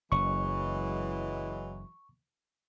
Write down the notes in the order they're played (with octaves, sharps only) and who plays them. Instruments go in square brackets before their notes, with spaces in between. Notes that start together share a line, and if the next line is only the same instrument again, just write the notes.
[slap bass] F#1 [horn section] E3 F#3 G#3 [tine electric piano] C#6